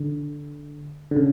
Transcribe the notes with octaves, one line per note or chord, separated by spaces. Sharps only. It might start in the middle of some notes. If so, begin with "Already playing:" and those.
Already playing: D3
D3
C#3